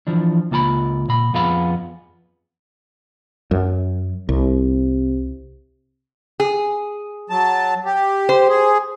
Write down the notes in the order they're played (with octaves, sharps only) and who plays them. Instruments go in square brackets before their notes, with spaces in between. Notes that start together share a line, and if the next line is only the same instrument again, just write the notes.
[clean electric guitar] E3 F3 D4
C#2 A#3 F4 A5 B5
A#2 B5
F2 B3 F4 G#4 F5 B5
[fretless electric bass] F#2
[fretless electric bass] C2 [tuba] C3
[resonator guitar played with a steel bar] G#4
[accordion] F#3 A5
G4
[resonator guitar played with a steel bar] C5
[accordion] G#4